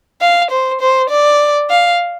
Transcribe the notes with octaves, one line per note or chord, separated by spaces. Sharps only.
F5
C5
C5
D5
F5